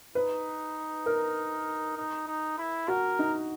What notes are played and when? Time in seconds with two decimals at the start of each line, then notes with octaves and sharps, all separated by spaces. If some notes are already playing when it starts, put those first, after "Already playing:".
0.15 D#4 B4
1.06 A#4
1.97 D#4
2.27 D#4
2.58 E4
2.88 F#4 A#4
3.19 D#4